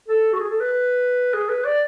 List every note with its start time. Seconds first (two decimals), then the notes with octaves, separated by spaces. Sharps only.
0.08 A4
0.33 F#4
0.40 G#4
0.50 A4
0.60 B4
1.34 G#4
1.49 B4
1.65 D5